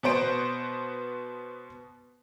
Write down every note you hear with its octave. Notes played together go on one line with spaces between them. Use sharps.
B2 B3 C5 D7